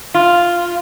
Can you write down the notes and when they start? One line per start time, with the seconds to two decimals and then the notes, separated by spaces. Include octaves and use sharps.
0.14 F4